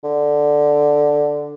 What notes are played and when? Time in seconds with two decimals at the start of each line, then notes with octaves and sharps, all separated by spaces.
0.04 D3